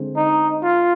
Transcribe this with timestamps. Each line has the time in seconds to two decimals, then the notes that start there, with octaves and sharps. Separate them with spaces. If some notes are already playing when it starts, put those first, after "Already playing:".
Already playing: D3 G#3 C4
0.16 D#4
0.63 F4